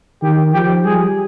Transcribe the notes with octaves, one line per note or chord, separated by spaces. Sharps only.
D#3 G4
F3 G4
G3 G#4